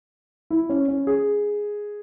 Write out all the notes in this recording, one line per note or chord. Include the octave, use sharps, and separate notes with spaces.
E4
C#4
C#4
G#4